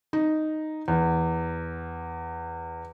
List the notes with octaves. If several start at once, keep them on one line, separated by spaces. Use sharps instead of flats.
D#4
E2